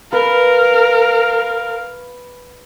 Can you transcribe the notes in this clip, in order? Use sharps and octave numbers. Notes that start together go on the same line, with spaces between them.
A#4 B4 F5